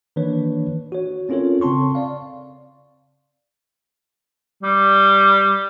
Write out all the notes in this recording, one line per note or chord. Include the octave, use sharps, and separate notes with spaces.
D#3 E3 A#3 D4 B4 C#5
F#4 C#5
C4 C#4 F4 A4 A#4 C#5
C#3 C4 A5 C6 C#6
D5 F5
G3